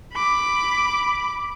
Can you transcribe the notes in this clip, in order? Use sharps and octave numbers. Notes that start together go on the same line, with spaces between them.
B5 D6